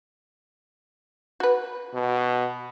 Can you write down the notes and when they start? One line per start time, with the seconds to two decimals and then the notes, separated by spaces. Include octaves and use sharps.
1.40 F#4 B4
1.94 B2